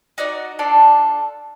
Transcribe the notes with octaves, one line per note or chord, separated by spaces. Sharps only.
D#4 F#4 D5 D#5
D4 F4 A4 D5